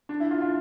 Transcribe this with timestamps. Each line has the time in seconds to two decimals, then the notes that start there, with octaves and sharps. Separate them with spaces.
0.09 D4
0.20 E4
0.31 F4
0.41 F4